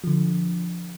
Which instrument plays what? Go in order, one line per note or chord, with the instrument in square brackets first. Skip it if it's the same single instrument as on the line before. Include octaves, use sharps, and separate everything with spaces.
[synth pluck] D3 F3